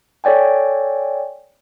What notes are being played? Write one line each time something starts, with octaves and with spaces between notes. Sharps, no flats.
A4 C#5 D5 G5 G#5